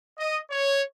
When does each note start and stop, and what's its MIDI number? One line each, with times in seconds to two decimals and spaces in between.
0.18 0.39 75
0.50 0.82 73